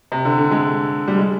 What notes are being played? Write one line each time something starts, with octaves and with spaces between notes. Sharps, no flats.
C3
D3
D3
G#3
G3
G#3